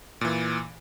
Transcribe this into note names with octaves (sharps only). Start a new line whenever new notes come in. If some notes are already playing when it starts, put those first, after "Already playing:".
A#2 E3